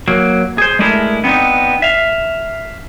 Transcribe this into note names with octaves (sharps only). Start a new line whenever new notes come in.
F#3 A#3
G#4 C5
G#3 A3 D4 E4 G#4 A#4
B3 C4 D4 D#4
E5 F5